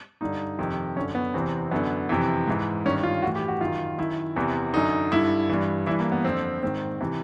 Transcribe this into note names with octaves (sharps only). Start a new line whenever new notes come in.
G2 D3 D#4
F2 C3 D#3
F#2 D3 C#4
B3
E2 C3 E3 C4
F#2 D3 B3
F2 C3 E3
G#2 E3
G2 D#3 C#4
F4
A2 E3 F#4
G4
F#4
F#2 D#3 F4
F#2 D#3 E4
E2 C3 E3
F#2 D3 D#4
G2 D3 E4
G2 E3
G2 E3 E4
A#3
B3
F2 D3 C4
G#2 D#3 C4
C3 E3